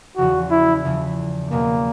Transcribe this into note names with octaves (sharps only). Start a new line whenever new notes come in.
E2 C#3 F3 F#4
E4
E2 C#3 F3
E2 B2 F#3 A#3